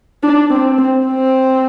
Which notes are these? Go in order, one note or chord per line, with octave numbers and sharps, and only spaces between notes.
D4
C4
C4
C4